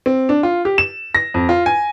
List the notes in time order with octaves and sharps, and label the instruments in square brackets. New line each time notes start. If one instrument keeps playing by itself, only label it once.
[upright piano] C4
D4
F4
G4
E7
A#6
F2
F4
G#5